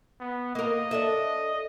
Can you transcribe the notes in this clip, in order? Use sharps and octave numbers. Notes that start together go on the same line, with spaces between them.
B3
A#3 A#4 D#5
D4 A4 E5